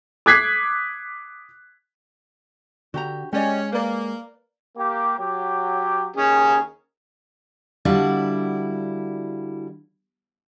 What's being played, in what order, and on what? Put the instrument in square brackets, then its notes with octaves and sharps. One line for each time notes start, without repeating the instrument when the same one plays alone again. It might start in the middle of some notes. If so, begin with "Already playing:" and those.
[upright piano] D6 D#6 F#6 G#6 B6 C7
[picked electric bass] D3 [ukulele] F#4 G4 A#5
[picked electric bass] G#3 [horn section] C#4 [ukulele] G4 D5 D#5
[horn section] A#3 [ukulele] B4 D5
[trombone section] A#3 G4
F#3 G4
[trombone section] D#2 D#3 [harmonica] C#4 G#4
[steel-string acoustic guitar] D3 G3 D4 E4 F#4 F5